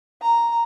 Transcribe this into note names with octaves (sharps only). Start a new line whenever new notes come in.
A#5